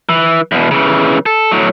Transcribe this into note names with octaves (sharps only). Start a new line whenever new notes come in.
E3
E2 B2
C#3 E3
A4
A2 F#3